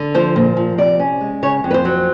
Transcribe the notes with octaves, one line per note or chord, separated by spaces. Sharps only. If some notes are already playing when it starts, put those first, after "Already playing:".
Already playing: D3
F3 C5
A#2
F3
C3 D5
C#4
G#3
C#3 C#5
F2
B4
C5
F#3